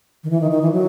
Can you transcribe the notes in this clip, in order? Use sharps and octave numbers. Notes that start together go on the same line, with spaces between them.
D#3
E3
D#3
D#3
E3
F#3